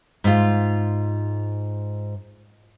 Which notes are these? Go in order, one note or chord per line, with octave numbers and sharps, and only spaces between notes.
G#2 F4